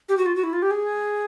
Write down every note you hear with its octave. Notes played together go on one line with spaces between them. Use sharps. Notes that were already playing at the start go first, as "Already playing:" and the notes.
G4
F#4
F4
F#4
E4
F4
G4
G#4